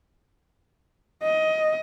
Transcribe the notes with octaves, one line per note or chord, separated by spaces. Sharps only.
D#5